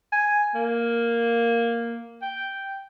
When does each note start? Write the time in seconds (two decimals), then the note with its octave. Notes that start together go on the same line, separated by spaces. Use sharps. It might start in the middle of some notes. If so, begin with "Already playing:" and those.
0.12 G#5
0.55 A#3
2.22 G5